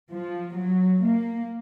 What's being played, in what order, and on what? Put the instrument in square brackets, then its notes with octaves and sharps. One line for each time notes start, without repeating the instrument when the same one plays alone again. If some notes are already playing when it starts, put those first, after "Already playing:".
[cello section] F3
F#3
A#3